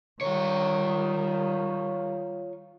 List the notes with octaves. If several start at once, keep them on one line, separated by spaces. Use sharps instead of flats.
D#3 G3 F4 C#5